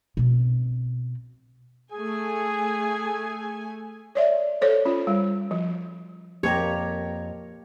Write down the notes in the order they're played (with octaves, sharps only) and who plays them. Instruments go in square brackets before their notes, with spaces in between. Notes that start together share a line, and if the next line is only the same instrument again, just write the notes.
[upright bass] B2 C4
[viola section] A3 G#5 [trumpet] G#4
[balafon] C#5 D5 E5
A4 C5 C#5
C#4 F4
G3
F3
[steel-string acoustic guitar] F2 A4 A#5 [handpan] A#3 G4 [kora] C#5